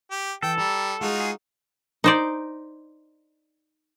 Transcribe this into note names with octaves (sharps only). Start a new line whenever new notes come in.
G4
E3 A4 G5
G3 A#5
G#3 D#4 F4 F#4
G#4
D#4 C5 D5